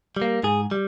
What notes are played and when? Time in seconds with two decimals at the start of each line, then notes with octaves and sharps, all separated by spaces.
0.17 G3
0.22 A#3
0.43 G#2 G#4
0.71 G3